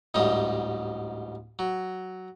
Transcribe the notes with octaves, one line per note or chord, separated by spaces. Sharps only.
A1 D2 G#2 G3 D#5
F#3